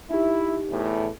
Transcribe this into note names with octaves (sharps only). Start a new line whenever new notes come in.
D#4 E4 G4
E2 A2